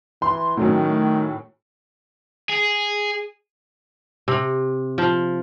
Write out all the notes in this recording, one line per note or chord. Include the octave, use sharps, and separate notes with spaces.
E3 C6
A2 D#3 F#3 C#4
G#4
C3
F3